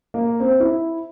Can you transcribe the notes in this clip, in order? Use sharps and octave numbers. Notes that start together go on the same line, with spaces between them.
A#3
C4
E4